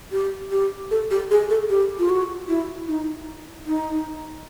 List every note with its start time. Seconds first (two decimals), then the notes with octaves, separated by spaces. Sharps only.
0.12 G4
0.52 G4
0.91 A4
1.11 G4
1.31 G#4
1.50 A4
1.70 G4
1.99 F4
2.09 F#4
2.48 E4
2.88 D#4
3.67 D#4